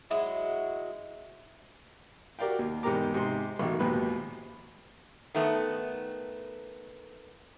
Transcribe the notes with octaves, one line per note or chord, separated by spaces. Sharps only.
F#3 G#3 E4 F#4
F#4 G4 A#4 D5 F5 G5
D#2
E2 G#2 G4 A#4 A#5 D6
G#2 C3 C6
A1 B2 D#3
A#1 D#2 G#2 B2 G4 B4
D#3 A3 B3